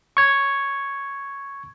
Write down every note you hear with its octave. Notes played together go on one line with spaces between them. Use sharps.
C#6 G#6